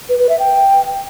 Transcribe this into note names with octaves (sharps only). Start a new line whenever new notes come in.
B4
B4
E5
G5